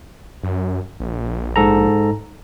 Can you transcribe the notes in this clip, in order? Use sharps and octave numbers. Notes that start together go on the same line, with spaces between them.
F#2
A#1
G#2 A4 A#5